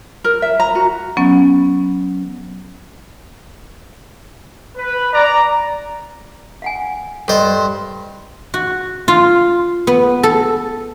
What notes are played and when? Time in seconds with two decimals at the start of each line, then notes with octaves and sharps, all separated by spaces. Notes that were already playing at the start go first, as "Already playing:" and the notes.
0.24 A#4
0.42 E5
0.60 A#5
0.75 F#4
1.17 F#3 B3 C#4
4.77 B4
5.14 D5 A#5
6.62 F5 F#5 G#5
7.28 G2 A4 C5 D#5 C6
8.54 F#4
9.08 F4
9.87 B3
10.23 A4